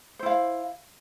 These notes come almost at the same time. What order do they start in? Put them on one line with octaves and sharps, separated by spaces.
C5 E4 F5